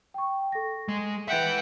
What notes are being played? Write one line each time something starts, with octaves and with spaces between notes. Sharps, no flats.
G5 C#6
A4 A#6
G#3
B4 E5 F#5 G5